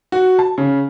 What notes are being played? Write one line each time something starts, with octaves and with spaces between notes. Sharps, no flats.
F#4
A5
C#3